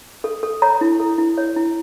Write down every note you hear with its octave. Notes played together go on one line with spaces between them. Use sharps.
A4
A4
C#5 A#5
E4
A4
E4
C#5
E4